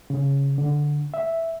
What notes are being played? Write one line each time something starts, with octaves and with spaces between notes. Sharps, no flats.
C#3
D3
E5